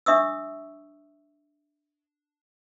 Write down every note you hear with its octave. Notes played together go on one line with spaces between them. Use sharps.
D4 E5 C#6 D#6 E6